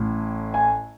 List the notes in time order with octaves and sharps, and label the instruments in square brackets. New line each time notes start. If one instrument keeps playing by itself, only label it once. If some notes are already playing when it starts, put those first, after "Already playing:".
Already playing: [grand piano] A1 A2
G#5